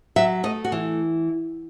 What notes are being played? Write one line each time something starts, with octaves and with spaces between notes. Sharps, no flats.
F#3 E5
A3 D#5
F#4
E3